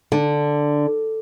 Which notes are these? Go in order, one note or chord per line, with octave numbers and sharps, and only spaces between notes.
D3